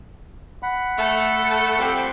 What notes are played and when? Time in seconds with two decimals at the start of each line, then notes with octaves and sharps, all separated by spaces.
0.63 F#5 B5
0.97 A3 A4
1.79 F2 G3 C4